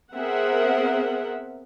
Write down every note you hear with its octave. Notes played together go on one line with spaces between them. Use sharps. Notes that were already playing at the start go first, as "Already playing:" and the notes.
B3 C4 G#4 A#4 E5 F#5